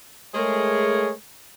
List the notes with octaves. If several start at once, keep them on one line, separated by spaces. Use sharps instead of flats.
G#3 A3 G#4 A#4 C#5